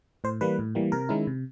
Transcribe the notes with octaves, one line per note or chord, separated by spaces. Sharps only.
A2 C5
E3 G3 A#3 B4
A2
E3 G3 A#3
C3 A#4
D#3 G#3 C#4 E4
C3